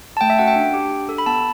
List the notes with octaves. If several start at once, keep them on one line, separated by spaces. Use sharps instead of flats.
A5
A3 G5
E5
C#4 F#4 A4 F#5
G5
D4
G4
D4
A4
B5
B3 A5